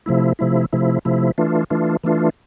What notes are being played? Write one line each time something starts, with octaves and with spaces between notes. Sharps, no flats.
C3 F3 A3 E4
C3 F3 A3 E4
C3 F3 A3 E4
C3 F3 A3 E4
E3 A3 D4 F4
E3 A3 D4 F4
E3 A3 D4 F4